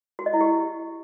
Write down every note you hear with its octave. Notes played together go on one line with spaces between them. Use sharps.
F#4
D#5
E4
G4